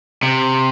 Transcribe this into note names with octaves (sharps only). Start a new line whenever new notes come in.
C3